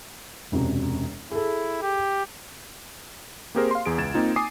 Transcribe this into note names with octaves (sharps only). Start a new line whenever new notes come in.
E1 F#2 C3
E4 G#4 A4
G4
A#3 C4 G4 G#4 A#4 C5
F5 C6
E2 G#4 D7
C#2 G#6 A6 E7
A#3 C4 D#4 F4
G#5 D6 D#6 C7